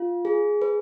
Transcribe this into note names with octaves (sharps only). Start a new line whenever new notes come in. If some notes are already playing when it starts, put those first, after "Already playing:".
Already playing: F4
G#4
B4